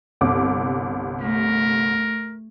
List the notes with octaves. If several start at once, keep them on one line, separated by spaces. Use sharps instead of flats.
G1 C2 D6
A3 A#4